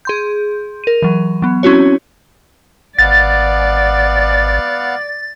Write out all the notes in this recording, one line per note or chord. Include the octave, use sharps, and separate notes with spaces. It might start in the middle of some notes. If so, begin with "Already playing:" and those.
G#4 C6 G6
A#4 D#7
E3 F#3
F#3 B3
C4 C#4 E4 F#4 C#5
G#1 B3 D5 F5 F#5 A6